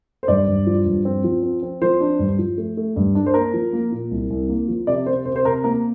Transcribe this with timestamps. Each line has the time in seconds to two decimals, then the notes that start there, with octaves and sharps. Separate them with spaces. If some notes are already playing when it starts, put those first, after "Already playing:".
0.23 C5
0.28 G2 D5
0.48 G2
0.66 F3
0.86 G2
1.05 C4
1.24 F3
1.43 C4
1.63 C4
1.82 F3 C5
2.00 D4
2.19 G2
2.39 F3
2.58 A3
2.77 A3
2.96 G2
3.15 D4
3.26 C5
3.34 A#3 A#4
3.53 F3
3.73 A#3
3.92 A#2
4.11 C2
4.30 C2
4.49 A#3
4.68 F3
4.87 C3 D5
5.06 C3 C5
5.25 C3 C5
5.36 C5
5.45 C3 A#4
5.64 A#3 A#4